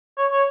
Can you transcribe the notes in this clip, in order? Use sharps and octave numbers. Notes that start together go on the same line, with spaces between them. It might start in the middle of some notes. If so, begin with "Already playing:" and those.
C#5
C#5